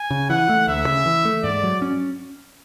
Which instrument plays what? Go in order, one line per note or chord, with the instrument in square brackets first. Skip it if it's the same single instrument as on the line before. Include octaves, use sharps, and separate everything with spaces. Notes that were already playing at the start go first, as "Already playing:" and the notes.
Already playing: [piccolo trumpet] G#5
[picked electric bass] C#3
[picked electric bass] E3 [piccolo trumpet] F#5
[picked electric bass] A3
[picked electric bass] D2 [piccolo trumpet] E5
[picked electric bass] C#3
E3
A3
[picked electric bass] G#2 [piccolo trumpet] D5
[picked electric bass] F#3
C#4